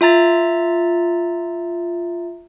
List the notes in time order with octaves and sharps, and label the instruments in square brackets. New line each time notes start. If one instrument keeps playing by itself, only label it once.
[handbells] F4 E5 A#5 A6